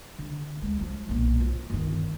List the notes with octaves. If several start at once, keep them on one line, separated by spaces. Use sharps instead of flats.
D3
D2 G#3
F3 G3
B1 A#2
F3 F4
G1 D#3